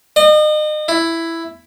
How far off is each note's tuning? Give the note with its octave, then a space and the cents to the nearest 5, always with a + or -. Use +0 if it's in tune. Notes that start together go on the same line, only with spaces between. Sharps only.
D#5 -35
E4 +5